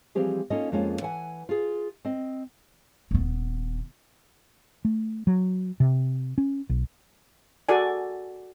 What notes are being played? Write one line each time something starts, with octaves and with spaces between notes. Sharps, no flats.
E3 F3 G3 C4 G4 G#4
A#3 C#4 D#4 F4 A4 D#5
F2 G#3 A#3 C#4 F4
E3 F#5 G#5
F4 G#4
C4 D#5
D#1 B3
A3
F#3
C3
C#4
B1
F#4 G#4 A4 D5 G#5